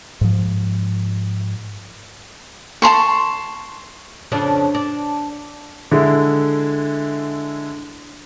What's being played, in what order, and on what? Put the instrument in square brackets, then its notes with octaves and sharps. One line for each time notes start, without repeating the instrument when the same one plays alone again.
[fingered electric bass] G#2 F3
[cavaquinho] A5 A#5 C6 C#6
[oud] F2 C#3 D4
D4
[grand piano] D3 G#3 E4